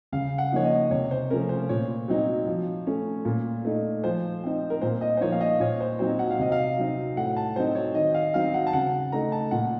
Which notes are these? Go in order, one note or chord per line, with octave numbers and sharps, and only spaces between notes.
C#3 F5
F#5
F3 A#3 D#4 C#5
D#5
C3 C#5
C5
F3 A3 C#4 A#4
C5
A#2 C#5
F#3 C4 D#4
F3
A3 C#4
A#2
A3 D#4
F3 C5
C4 D#4
A#4
A#2 C5
D#5
C5
F3 A#3 D#4 C#5
F5
D#5
A#2 C#5
C5
F#3 C4 D#4 C5
F#5
F5
C3 D#5
F5
F#3 C4 D#4
A2 F#5
A5
F#3 C4 D#4 C5
C#5
D#3 D#5
F5
F#3 C4 D#4 F5
F#5
A5
C#3 F#5
A3 D#4 A#5
A5
A#2 F#5